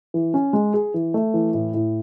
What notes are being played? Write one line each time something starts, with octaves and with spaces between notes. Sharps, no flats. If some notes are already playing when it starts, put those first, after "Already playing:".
E3
C#4
G#3
G#4
E3
A3
E3
A2
A2